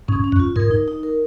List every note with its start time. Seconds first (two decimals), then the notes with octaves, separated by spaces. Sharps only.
0.08 G#2 C#4
0.24 C#4
0.32 F#2
0.40 F4
0.56 G#2 A#4
0.71 D#4
0.88 D#4
1.03 A#4